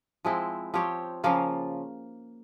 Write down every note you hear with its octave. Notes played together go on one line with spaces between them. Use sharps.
F3 G#3 C4 E4
F3 C4 G4 C#5
C#3 F3 A#3 F4